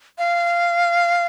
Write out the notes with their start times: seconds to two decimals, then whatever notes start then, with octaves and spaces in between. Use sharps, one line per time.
0.18 F5